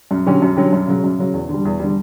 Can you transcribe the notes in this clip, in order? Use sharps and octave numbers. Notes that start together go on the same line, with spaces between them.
F#2
D3 F#3 C#4 G4
F#2
D3 F#3 C#4 G4
F#2
C#3 F#3
F#2
C#3 F#3
E2
D3
G3
E2
D3 G3